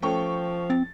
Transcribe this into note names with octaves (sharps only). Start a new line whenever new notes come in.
F3 A3 C#4 A4 G5 C#6
C4 A6